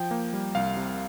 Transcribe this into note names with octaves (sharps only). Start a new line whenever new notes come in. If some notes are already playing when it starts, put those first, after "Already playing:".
Already playing: F3 G5
A#3
G3
C2 F5
C3